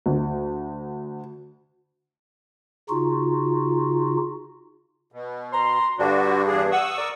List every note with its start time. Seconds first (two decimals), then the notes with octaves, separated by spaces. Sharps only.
0.06 D2
2.89 C#3 D#4 F4 F#4
5.12 B2
5.52 A#5 C6
5.99 G2 D3 D4 F#4
6.47 E2 D4 G#4
6.72 F#5 C#6 D#6 E6
6.97 A#4 D5